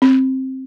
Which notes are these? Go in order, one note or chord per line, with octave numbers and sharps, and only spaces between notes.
C4